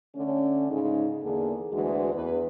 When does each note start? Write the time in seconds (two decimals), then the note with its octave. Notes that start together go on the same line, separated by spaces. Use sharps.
0.16 D3 A3 C#4
0.71 G#2 C#3 G#3 D#4
1.23 E2 D3 A#3 G#4
1.73 D2 E3 G#3 D4 F#4
2.13 E2 B4